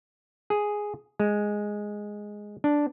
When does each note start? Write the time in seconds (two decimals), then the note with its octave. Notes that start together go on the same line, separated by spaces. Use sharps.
0.50 G#4
1.20 G#3
2.64 D4